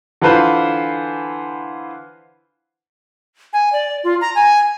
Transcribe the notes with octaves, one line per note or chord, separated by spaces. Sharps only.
D3 E3 F4 B4 C5
G#5
D5
F4
A#5
G#5